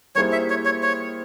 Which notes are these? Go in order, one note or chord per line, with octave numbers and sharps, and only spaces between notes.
G3 A#3 E4 G#4 C5 C#5
E5
C#5
C#5
C#5